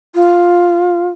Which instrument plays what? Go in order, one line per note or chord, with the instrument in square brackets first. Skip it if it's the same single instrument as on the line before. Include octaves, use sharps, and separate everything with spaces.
[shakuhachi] F4